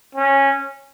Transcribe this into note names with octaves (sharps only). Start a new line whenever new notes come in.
C#4